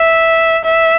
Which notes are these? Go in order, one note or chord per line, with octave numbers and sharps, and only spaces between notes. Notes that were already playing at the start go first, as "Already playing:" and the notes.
Already playing: E5
E5